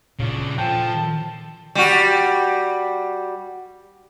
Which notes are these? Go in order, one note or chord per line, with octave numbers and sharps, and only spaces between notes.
A#2 C#3 D4 E4
F3 A4 G5
G3 F#4